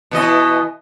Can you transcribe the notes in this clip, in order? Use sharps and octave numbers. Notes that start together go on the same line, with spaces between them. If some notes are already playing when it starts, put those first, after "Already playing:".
B2 E3 D#5